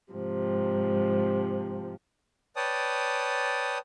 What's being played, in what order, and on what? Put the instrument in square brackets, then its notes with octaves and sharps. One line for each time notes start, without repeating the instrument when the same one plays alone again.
[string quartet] G#2 C3 F3
[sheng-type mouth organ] B4 C#5 D5 G5 A5 D#6